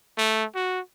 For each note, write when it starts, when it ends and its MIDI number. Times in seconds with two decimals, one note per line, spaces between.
0.18 0.45 57
0.55 0.80 66